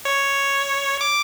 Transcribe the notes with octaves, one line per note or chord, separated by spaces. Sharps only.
C#5
D6